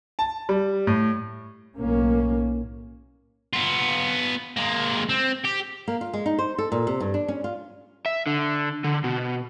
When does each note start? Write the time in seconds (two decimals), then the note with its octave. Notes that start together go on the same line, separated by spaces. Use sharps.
0.19 A5
0.49 G3
0.87 A2
1.78 B1 A2 A#3 C#4
3.53 B3 F4
4.57 G#3 A#3
5.09 C4
5.44 G4
5.88 A#3
6.01 F4
6.13 G#3
6.26 D#4
6.39 C5
6.58 A4
6.72 A#2
6.87 C3
7.00 G2
7.14 D4
7.28 C#4
7.44 F4
8.06 E5
8.26 D3
8.84 D3
9.04 B2